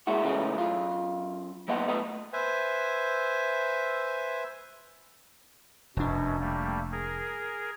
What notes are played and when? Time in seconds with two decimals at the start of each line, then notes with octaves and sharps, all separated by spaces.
0.07 G#3 A#3 E4 F#4
0.24 C#3 E3 G#3 A3 C#4
0.55 F#2 F4
1.68 F#3 A#3 B3 D#5 F5 F#5
1.88 A3 B3 B4 D#5
2.33 B4 C5 E5 G#5
5.97 F1 F#2 B2 D4
6.40 G3 A3 A#3
6.92 G#4 A#4